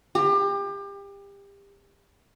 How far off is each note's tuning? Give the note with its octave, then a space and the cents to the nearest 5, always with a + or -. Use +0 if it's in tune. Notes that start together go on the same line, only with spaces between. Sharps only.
G4 +30